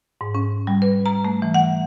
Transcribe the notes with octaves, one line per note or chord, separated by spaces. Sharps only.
G#2
C#4
G3
B4
A#5
A3
E3
F#5